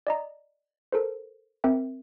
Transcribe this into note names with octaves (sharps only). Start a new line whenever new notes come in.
D5 D#5 A#5
A4 A#4 C5
C4 A#4 E5 G5